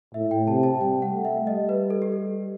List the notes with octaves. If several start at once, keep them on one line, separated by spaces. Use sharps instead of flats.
A2 E5
G5
C3 A5
A5
G3 G5
F#5
A3
E5
G3 D#5
B4
A4
G4
A4